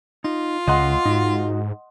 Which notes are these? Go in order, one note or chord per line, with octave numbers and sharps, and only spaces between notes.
D#4 F4
C#2 C#3 D#5 F#5 C6
G#2 D#4 F#4